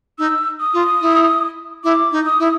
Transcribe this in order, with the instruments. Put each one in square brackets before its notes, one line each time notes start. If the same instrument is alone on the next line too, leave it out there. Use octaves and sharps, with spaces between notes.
[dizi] D#4 [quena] E6
[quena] D#6
[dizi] F4
E4
[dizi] E4 [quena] D6
[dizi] D#4
[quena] D#6
[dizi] E4